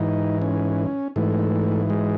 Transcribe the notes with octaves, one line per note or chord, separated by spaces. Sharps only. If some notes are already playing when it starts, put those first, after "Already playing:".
Already playing: G#2 E3 D#4
C#4
G#2 E3 A3
G#3